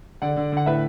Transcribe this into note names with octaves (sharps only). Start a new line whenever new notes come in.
D3 D5 F#5
D3
D3 F#5
A2 B4 E5